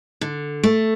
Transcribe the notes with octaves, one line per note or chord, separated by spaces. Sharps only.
D3
A3